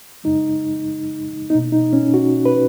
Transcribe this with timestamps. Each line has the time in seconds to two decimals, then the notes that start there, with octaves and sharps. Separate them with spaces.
0.24 F#2 C#3 G#3 D#4
1.50 B2 A#3 D#4
1.72 D#4
1.93 C#4
2.14 F#4
2.46 B4